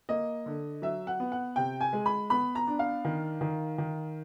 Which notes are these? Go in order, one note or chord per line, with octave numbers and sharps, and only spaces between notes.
A#3 D#5
D3
F#3 E5
F#5
B3
F#5
C3 G5
G#5
G#3
B5
B3 B5
A#5
D4
F5
D#3
D#3
D#3